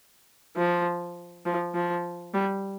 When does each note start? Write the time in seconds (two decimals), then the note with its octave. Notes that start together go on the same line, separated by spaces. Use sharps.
0.57 F3
1.45 F3
1.74 F3
2.34 G3